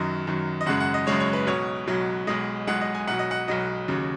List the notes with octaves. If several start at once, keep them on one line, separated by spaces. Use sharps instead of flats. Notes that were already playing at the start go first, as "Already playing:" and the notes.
Already playing: F#2 D#3 F#3 D#5
F#2 D#3 F#3
D#5
F#1 F#2 C#3 G#3 F#5
F#5
D#5
F#1 F#2 C#3 G#3 C#5
C#5
B4
B1 B2 F#3 C#5
B1 B2 F#3
B1 B2 G#3 D#5
B1 B2 G#3 F#5
D#5
G#5
B1 B2 F#3 F#5
D#5
F#5
B1 B2 F#3 D#5
D#2 C#3 F#3